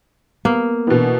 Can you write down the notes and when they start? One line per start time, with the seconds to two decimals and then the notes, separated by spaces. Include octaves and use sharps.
0.45 A#3 B3
0.87 B2 E3 B3 D4